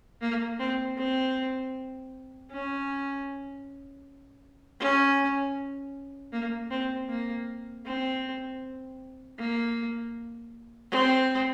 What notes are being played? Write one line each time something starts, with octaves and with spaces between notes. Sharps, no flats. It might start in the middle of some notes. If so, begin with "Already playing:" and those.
A#3
C4
C4
C#4
C#4
A#3
C4
A#3
C4
A#3
C4